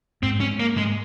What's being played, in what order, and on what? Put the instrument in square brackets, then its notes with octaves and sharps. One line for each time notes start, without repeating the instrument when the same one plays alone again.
[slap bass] G#2 [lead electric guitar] C4
[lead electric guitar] C#4
A#3
G#3